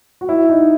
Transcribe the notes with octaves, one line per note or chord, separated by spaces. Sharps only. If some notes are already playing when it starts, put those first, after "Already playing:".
F#4
E4
D#4